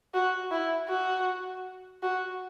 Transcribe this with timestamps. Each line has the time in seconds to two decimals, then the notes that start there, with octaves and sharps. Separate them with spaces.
0.14 F#4
0.51 E4
0.89 F#4
2.03 F#4